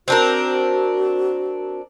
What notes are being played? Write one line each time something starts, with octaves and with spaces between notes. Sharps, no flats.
C4 D4 F#4 A#4